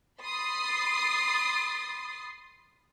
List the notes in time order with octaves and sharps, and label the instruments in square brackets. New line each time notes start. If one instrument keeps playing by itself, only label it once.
[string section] B5 C6 D#6 A6 C7